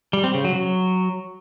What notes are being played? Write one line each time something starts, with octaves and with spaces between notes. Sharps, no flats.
G3
C4
C#3
F#3
F#3